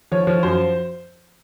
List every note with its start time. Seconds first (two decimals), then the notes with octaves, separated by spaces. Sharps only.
0.12 F3 C#5
0.27 F3
0.43 F#2 C5